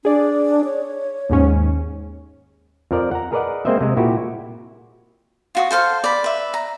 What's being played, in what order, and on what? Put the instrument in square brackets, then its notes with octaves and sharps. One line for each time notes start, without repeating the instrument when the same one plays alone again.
[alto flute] D4 [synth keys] G#4 D5
[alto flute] C#5
[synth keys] D#2 G#2 C#4
[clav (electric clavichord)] F2 F3 A#4 D5
F#5 A#5
G#4 A#4 B4 D5 D#5 F#5
G#3 A#3 C4 C5 D#5 E5
C3 G#3
A#2 E4 F#4 G4
[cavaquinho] F4 F#4 D#6
A4 C5 F5 C6
D5 B5
B4 E5
A#5